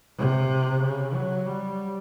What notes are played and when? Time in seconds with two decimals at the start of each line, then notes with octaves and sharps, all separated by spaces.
0.18 C3
0.82 C#3
1.15 F#3
1.46 G3